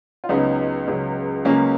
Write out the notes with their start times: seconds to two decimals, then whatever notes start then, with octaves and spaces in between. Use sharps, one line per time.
0.24 F4
0.29 C#2 C#3 F#3 B3 D#4
0.88 C#2 C#3 F#3
1.45 C#2 C#3 F#3 A#3 C#4